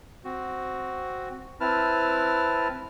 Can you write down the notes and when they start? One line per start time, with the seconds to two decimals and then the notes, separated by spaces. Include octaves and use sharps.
0.25 C4 F#4
1.60 C4 E4 B4 A5 F6